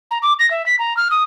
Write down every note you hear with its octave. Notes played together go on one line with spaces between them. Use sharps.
A#5
D6
A#6
E5
B6
A#5
F6
D#6